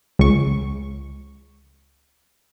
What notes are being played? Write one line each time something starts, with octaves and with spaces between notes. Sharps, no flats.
C#2 C#6